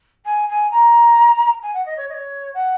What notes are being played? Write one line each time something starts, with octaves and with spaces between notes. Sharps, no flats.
G#5
G#5
A#5
G#5
F#5
D#5
C#5
D#5
C#5
F#5